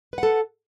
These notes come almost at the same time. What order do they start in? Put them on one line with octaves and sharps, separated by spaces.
B4 F#5 A4